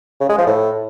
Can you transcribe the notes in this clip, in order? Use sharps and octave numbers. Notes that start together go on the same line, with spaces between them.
C#3
G#3
F3
A2